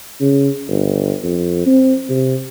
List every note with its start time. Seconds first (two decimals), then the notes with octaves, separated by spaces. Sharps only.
0.21 C#3
0.68 G1
1.23 F2
1.66 C4
2.09 C3